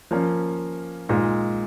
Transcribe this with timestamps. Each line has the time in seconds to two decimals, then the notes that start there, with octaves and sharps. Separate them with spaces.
0.11 F3 A#3 C#4
1.09 A#2 G#3 D#4